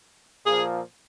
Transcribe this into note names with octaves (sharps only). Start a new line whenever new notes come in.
A#2 F3 G#4